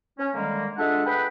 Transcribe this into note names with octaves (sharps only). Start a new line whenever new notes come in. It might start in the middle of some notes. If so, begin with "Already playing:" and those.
C#4
D3 D#3 G3 G#3 A#3
G#3 D4 F4 A4 E5 F#5
G#4 B4 F#5 G5 B5